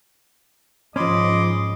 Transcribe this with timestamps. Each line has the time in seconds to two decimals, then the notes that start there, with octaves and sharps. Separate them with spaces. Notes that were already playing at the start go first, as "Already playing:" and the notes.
0.96 G#2 F3 C#4 D#5 B5 C6 D6